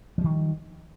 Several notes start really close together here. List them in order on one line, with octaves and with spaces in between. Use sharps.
F3 G3 D#3